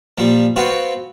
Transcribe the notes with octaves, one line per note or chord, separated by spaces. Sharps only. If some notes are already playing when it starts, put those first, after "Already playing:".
A#2 F3 G3
B3 C4 F4 F#4